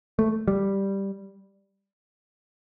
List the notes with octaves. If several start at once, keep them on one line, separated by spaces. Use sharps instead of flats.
A3
G3